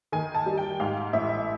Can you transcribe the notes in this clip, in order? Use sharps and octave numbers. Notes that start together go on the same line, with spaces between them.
D#3 G#5
A5
G3
G5
G#2 F5
A1 E5